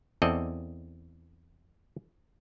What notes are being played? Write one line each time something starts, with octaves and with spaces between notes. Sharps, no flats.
E2 C4 A4 D5 D#5